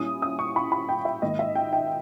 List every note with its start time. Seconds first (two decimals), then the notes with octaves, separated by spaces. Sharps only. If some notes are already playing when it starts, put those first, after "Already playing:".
Already playing: A#2 G3 C#4 E4 D#6
0.22 D#6
0.39 C#6
0.56 B5
0.72 B5
0.89 G5
1.05 E5
1.22 G#2 D#3 A#3 D#5
1.39 E5
1.55 G5
1.73 G5